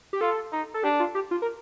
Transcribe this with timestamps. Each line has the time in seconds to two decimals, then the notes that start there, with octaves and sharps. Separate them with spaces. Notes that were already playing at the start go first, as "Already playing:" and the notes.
0.13 G4
0.21 F4 A4
0.52 D#4
0.74 A4
0.84 D4 G4
1.00 F4
1.15 G4
1.31 F4
1.42 A#4